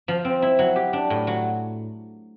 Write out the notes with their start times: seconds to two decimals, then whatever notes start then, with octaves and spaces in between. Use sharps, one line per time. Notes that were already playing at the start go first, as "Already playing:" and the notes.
0.08 F3
0.25 C4
0.42 E4
0.59 F#3
0.76 G4
0.93 D4
1.10 A2
1.27 F#3